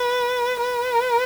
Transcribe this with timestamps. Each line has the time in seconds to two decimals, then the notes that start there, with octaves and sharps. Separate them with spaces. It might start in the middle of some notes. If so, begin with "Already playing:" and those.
Already playing: B4
0.60 B4